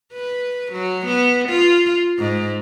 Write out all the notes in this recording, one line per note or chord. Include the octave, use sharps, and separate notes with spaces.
B4
F#3
B3
F4
G#2